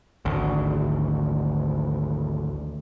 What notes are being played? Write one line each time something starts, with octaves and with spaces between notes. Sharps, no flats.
G#1 D2